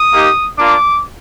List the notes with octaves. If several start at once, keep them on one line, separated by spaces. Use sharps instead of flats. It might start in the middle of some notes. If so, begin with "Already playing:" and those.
Already playing: D#6
A#3 D#4 G4
A#3 D4 F4 D6